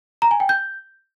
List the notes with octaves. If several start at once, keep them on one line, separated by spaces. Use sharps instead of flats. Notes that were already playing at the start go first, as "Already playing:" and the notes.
A#5
G#5
G5
G6